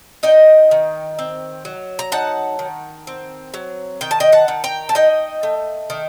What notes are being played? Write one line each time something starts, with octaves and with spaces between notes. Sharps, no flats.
D#4 D#5 G5
D#3
C4
F#3
A#5
D#4 F#5 A5
D#3
C4
F#3
D#3 G5
A5
D#5 G5
F#5 A5
D#3
G5 A#5
A5
D#4 D#5 G5
A3
D#3